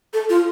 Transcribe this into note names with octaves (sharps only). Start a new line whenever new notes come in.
A4
F4